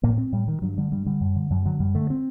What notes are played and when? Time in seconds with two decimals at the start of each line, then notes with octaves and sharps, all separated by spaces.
0.03 A2 A#3
0.18 C4
0.33 A2 G3
0.48 D#3
0.62 G2 F#3
0.78 D3 G3
0.92 G2 G3
1.06 D3 G3
1.21 F#2
1.36 D3
1.51 F#2 F#3
1.65 D3 F#3
1.80 F#2 G3
1.95 D3 A3
2.10 C4